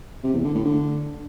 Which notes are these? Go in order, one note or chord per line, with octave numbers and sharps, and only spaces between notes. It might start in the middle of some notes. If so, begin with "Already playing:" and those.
C3
E2
D3
A2
D3